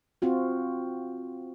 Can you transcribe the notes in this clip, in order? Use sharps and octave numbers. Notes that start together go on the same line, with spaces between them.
C4 F4 F#4